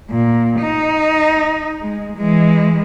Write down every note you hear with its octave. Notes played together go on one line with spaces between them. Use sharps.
A#2
D#4
G#3
E3 G#3